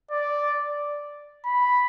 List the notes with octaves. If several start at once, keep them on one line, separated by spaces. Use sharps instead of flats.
D5
B5